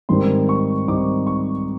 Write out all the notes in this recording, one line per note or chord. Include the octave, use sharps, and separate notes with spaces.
G#2 D#3 G3 C4 D#4 C6
C#6
G#2 D#3 G3 C4 D#4 D6
C#6